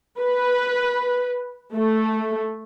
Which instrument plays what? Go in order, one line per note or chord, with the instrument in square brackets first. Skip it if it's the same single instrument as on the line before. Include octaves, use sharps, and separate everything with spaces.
[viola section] B4
A3